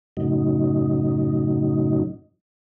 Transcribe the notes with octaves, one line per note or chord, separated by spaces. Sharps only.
F#2 A2 C#3 F#3 D#4